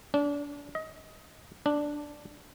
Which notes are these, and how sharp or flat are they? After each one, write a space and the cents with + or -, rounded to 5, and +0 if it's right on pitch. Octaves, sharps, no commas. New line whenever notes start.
D4 -30
D#5 +25
D4 +0